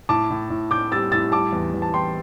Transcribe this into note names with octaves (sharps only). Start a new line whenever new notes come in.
A2 A5 D6
A2
A2
A2 D6 G6
G3 E6 A6
A2 E6 A6
G3 A5 D6
E2
E2
A5
E2 G5 C6